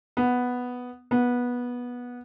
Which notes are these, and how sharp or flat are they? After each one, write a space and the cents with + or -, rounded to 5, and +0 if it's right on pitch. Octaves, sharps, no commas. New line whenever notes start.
B3 +0
B3 -15